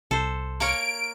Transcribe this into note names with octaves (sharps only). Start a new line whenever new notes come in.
C2 A4 C5
A#3 A#4 C#5 D7